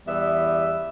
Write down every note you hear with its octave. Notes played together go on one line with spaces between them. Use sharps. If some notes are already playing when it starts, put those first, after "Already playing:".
E2 G3 B3 E5